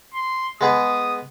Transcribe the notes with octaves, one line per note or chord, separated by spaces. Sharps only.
C6
G#3 B3 G#4 D#6